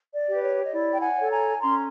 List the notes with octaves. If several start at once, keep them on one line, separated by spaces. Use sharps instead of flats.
D5
G4 B4
C#5
D#5
E4 D5
G5
F#5 G#5
A4 C#5
G#5 A#5
C#4 A#5 C6